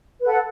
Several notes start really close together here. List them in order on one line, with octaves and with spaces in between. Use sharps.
B4 A4 F#5